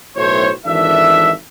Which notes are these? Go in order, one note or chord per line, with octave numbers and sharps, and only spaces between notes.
B1 A2 C5 C#5
G#1 E3 D4 A4 E5